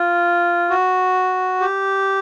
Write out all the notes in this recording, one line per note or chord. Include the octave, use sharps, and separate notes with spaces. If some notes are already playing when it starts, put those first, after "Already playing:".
Already playing: F4
F#4
G4